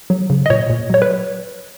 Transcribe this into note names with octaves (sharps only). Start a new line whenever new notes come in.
F#3
C#3
D#5
A#2 C#5
A#2
F#3 C#5
B4